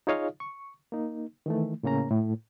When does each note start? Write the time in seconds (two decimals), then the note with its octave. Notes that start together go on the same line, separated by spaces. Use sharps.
0.07 D#4 F4 G#4 C#5 D#5 F5
0.40 C#6
0.92 A#3 D#4
1.46 D#3 E3 A3
1.83 A2 C#3 A#3 C#4 A#5
2.11 A2